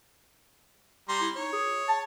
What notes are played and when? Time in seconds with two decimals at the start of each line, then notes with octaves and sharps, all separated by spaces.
1.09 G3 A#5 C6
1.21 E4
1.36 D#4 C#5
1.52 G#4
1.89 A5